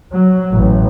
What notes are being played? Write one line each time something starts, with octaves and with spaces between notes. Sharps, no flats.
F#3
A1